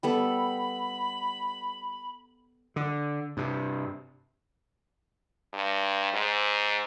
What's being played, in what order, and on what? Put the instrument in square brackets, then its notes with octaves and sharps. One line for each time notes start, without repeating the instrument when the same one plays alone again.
[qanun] G3 B3 A4 [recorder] B5
[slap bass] D3
G2 C3
[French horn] G2
G#2